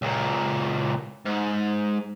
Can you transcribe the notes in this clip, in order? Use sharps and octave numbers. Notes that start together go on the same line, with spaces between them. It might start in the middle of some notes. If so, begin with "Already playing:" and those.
C#2 A#2
G#2